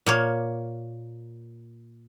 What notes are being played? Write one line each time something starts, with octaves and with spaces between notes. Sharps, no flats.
A#2 A#3 C#5